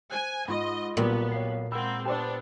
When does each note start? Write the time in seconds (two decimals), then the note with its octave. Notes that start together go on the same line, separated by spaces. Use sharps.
0.11 C5 G#5 F#6
0.48 G#2 F4 D#5 B5 C6
0.97 B1 A#2 G3 B3
1.32 C#5 F5 C7
1.72 G#3 A#3 C4 F#5 B5 E6
2.05 B3 D4 G4 C5 D5 A5